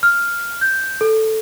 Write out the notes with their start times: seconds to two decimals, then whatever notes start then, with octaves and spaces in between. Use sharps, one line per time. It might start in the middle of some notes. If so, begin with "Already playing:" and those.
0.03 F6
0.61 G6
1.01 A4